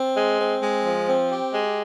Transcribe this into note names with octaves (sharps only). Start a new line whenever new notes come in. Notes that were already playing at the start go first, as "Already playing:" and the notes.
Already playing: C4
G#3
C4
G#3
F3
C4
G4
G#3